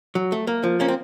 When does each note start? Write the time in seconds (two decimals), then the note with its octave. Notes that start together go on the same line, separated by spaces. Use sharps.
0.15 F#3
0.32 A3
0.47 A#3
0.64 F3
0.80 A#3 C#4
0.88 C4